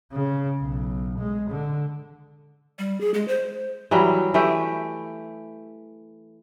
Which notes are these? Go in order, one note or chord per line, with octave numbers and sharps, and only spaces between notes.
C#3
B1
G#3
D3
G3
G#4
G#3
C5
E3 F#3 G3
E3 A3 G4